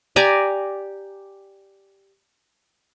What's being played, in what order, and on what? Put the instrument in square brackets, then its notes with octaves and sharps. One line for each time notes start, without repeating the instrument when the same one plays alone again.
[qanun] G4 D5 G#5 A#5